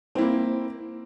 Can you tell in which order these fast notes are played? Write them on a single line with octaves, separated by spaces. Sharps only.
C4 E4 A#3